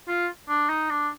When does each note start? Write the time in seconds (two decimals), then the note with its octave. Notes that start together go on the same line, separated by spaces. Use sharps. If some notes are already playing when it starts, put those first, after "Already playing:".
0.08 F4
0.49 D4
0.69 D#4
0.90 D4